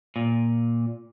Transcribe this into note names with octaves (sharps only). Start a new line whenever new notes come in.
A#2